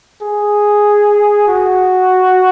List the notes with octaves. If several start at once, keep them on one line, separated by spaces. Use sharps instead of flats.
G#4
F#4